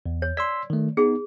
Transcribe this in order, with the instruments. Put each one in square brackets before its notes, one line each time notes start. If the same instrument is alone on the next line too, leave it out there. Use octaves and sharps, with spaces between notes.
[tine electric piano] E2
[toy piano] C#5
[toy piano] D5 [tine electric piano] C6 E6 B6
[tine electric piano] D#3 A3
[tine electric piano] B3 D#4 [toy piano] G#4